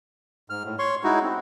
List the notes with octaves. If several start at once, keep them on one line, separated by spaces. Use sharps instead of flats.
G#2 F6
A2
C#5 C6 C#6
G#3 D#4 E4 F#4
C4